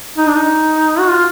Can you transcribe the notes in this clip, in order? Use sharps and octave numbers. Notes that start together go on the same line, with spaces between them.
D#4
D4
D#4
F#4
F4